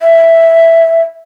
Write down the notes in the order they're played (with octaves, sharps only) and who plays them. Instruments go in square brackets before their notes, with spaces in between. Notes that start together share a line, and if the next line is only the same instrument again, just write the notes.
[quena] E5